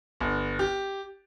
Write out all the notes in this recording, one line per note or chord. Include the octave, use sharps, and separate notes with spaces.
G1
G4